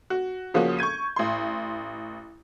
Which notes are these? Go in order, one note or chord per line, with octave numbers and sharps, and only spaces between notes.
F#4
C#3 F3 A#3 C#4 F#4
C#6 G6 G#6 D#7
A1 C6